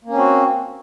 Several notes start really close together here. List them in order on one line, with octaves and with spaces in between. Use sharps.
A#3 C#4 C4 F#4